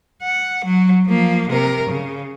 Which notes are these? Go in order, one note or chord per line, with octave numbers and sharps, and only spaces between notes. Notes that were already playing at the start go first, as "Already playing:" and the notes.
F#5
F#3
F3 A#3
C3 A#4
C#3